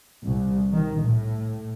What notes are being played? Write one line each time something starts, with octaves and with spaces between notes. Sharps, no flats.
C2
D#3
A2